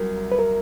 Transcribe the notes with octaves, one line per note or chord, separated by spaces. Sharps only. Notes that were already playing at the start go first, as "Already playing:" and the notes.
Already playing: C2 F#3 A#4
B4
A#4